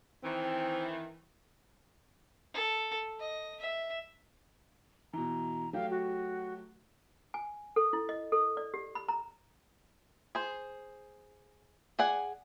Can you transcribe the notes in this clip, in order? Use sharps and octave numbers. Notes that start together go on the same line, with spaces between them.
D#3 E3 C4
A4
D#5
E5
B2 E3 A#5
F#3 A3 G4 F5
F#4
G#5
A4
E4
D#5
A4
D5
G4
B5
A#5
G#4 C5
G#4 D5 F#5 G#5